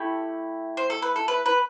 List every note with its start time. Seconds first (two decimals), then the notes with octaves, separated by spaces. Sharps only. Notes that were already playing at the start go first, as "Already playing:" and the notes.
Already playing: A3 E4 G4
0.77 C5
0.90 A4
1.02 B4
1.16 A4
1.28 B4
1.46 B4